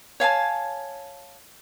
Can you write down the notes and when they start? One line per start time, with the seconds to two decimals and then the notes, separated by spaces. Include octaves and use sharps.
0.20 C#5 F5 G#5 A5